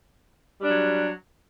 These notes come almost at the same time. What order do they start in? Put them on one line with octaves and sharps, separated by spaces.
G3 D4 F#3